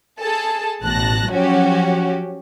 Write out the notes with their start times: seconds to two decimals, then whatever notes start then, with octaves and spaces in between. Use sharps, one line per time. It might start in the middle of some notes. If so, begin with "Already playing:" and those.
0.18 G#4 A4 A5
0.82 A1 B2 A5 F#6 A#6
1.30 F3 F#3 C#4 F#4 G4